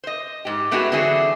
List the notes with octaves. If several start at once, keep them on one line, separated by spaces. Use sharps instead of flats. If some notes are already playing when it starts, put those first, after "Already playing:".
C5 D#5
G#2 G4
A3 B3 D4 E4 F#4 G#4
D3 E3 F#3 C4 E4 G#4